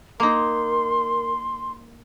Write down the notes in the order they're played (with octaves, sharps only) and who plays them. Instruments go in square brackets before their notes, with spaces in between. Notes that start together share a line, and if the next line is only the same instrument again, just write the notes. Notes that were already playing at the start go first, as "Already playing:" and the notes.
[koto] A#3 D#4 [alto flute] A#4 [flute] C6